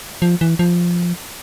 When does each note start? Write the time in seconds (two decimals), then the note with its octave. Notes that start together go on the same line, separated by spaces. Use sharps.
0.22 F3
0.41 E3
0.59 F3